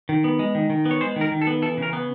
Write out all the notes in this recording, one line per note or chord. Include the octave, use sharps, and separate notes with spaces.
D#3
B3
G#3
D#3
D#3
B3
C#5
G#3 C5
D#3
A#4
D#3
A4
B3
E3 A4
C#3
A#4
B3